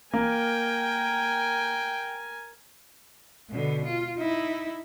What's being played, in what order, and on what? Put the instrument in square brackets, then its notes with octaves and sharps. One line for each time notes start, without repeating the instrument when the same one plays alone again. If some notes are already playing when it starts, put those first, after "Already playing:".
[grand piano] A#3 [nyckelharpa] A#4 G#5 [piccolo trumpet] G5
[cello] B2 D3
F4
D#4 E4